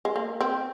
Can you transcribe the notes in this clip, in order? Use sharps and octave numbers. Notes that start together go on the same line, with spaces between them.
G#3
A#3
C4